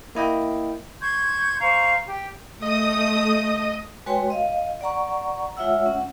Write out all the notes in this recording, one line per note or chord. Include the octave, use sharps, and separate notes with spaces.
A#3 E4 D#5 G5
C6 C#6 G6 G#6
C5 F5 A#5 C#6
G4
A3 D#5 D#6
G#3 F#4 B4 C#5 G5 C6
D#5 F5
D5 F#5 A#5 C#6
G#3 F4 C#5 E5 F#5 E6
C#4 F#5